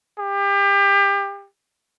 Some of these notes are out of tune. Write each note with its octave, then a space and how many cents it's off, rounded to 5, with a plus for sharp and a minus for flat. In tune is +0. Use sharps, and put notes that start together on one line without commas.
G4 +30